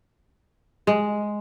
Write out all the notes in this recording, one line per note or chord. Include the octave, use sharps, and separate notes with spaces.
G#3